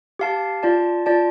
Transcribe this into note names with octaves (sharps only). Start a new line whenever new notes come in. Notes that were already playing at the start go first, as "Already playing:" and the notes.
G4 F5 A5
F4 D5 A5
F4 D5 A5